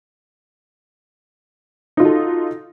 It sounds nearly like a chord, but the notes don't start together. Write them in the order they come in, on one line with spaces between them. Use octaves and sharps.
D#4 F4 F#4 A4